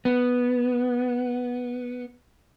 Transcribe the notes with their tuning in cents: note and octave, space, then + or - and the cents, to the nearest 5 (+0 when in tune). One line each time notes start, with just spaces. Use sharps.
B3 -5